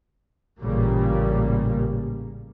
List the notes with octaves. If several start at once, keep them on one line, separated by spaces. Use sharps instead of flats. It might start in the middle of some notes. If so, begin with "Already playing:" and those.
A1 A#2 C#3 G3 A#3